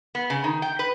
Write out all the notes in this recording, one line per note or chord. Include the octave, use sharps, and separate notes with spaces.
B3
C#3
D#3
G5
B4